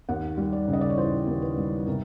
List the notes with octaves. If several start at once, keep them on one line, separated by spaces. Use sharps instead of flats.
D#2 F#5
G3
D5
C#3
D#5
D5
C#5
E3 C5
D#2
B4
G3
C3 A#4